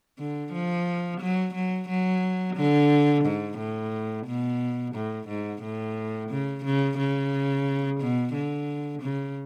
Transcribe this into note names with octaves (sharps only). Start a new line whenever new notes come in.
D3
F3
F#3
F#3
F#3
D3
G#2
A2
B2
A2
G#2
A2
C#3
C#3
C#3
B2
D3
C#3